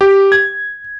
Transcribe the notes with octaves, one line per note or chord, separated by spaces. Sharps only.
G4
G#6